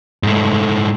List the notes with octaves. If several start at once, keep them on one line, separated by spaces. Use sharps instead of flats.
G#2 A3